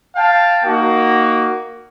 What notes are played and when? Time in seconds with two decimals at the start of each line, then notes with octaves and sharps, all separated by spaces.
0.15 F5 G5 A5
0.63 A#3 D#4 F#4